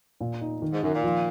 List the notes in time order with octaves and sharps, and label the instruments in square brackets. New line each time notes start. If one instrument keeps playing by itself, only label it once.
[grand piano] A#2
D#4
D#3
[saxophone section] G#2
[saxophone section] F#2 [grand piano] D#3
[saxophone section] A#2
[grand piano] F3